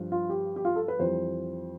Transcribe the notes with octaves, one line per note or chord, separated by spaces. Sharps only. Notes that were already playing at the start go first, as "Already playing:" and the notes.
Already playing: G2 F3
F4
G4
G4
F4
A4
B4
F2 E3 G3 C5